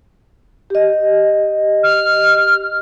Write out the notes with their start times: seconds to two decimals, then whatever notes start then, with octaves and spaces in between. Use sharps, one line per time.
0.70 G4 D#5
1.83 F6